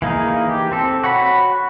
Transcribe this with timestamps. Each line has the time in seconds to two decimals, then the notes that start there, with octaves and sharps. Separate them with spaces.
0.02 E3 A#3 D#4 G#4
0.49 G4
0.72 C4 A4
1.04 F#4 C#5 F#5 B5